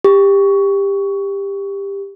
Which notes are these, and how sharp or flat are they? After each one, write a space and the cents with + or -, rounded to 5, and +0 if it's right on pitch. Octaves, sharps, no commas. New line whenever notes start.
G4 +20